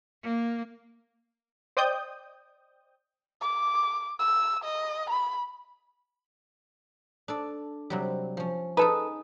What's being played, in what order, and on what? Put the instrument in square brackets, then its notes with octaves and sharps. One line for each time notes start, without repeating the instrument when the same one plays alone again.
[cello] A#3
[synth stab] C5 D5 D#5 G5 D#6 G6
[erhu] D6
E6
D#5
B5
[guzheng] D4 A4 D5
C3 F#3 G3
F3 C#4
[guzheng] D#4 G#4 [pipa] A4 B4